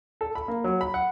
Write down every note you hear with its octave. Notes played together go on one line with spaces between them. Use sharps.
A4
B5
A#3
F#3
B5
F#5